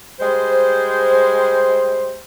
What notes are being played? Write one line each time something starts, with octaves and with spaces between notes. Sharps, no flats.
G3 G#3 C5